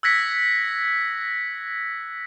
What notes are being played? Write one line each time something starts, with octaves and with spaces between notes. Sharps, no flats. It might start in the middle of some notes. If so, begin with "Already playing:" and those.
E6 F#6 G#6 A#6 B6 C#7